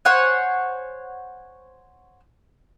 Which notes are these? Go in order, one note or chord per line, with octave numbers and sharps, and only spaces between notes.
C5 C#5 F#5 G#5